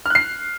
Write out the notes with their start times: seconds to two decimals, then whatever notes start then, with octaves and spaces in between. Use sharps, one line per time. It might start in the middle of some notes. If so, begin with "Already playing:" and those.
0.06 F6
0.10 F#6
0.15 C7